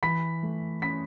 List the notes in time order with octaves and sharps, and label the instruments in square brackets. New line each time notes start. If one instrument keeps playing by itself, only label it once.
[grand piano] E3 B5 B6
A3
C#4 B5 B6